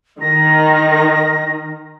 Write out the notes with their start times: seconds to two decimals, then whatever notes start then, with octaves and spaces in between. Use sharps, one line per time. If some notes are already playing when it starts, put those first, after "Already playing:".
0.21 D#3 A#6